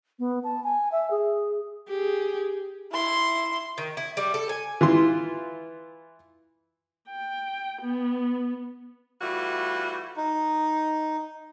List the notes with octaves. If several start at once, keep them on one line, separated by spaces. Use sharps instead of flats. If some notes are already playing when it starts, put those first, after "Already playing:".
B3
A5
G#5
E5
G#4
G4 G#4
E4 C6
D#3
E4
G3
A4
G#5
E3 F4 C6
G5
B3
E3 G3 A3 F4 F#4
D#4